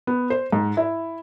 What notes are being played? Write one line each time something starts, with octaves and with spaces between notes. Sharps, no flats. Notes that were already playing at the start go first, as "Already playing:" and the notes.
B3
C5
G#2
E4